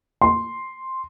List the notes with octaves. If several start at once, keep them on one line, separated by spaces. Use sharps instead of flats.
C6